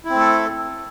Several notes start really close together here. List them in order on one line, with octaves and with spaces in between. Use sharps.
E4 C4 A3 A4